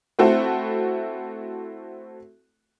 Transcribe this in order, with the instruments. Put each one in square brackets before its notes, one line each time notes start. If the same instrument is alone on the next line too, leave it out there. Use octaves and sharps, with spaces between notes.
[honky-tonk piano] A3 C4 E4 F#4 A4